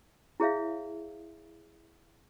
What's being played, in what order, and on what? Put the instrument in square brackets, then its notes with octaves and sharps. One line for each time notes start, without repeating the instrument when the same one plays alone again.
[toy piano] E4 G#4 C#5 E5 F5